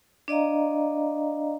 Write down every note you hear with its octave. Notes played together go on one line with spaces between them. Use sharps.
D4 D5 D#5 F5 A#5